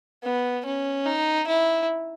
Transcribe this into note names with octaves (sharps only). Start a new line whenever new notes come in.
B3
C#4
D#4
E4